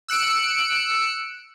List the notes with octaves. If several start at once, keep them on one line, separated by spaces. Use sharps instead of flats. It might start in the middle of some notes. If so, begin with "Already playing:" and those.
E6 F#6 C#7 D7